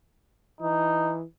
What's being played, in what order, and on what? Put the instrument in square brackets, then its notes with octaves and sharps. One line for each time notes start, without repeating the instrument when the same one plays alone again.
[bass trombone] E3 [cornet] D#4